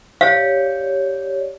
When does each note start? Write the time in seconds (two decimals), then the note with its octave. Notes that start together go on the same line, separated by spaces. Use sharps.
0.21 G4 C#5 D5 F5